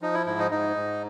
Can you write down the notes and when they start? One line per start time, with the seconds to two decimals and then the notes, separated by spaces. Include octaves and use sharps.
0.01 F3 D#4
0.14 E4
0.26 G#2 E4
0.39 D#4
0.51 G#2 D#4
0.76 G#2